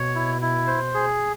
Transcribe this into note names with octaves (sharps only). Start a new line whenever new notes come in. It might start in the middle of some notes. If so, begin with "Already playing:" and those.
Already playing: B2 C#5
E4
E4
C5
G#4